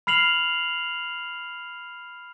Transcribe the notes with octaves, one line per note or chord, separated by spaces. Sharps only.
B5 F6 C7 F7 F#7